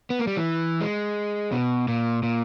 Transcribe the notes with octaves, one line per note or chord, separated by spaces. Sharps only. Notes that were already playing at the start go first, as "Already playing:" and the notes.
B3
A#3
G3
E3
G#3
B2
A#2
A#2